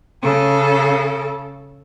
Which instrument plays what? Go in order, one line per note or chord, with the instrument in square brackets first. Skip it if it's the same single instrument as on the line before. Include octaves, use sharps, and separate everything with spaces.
[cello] C#3 A4